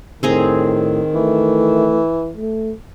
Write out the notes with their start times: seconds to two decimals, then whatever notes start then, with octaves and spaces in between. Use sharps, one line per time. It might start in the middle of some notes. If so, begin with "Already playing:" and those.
0.23 A2 D#3 C4 G#4 A#5
1.14 E3 A3
2.37 A3